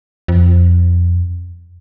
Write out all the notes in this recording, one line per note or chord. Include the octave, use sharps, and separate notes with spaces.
F2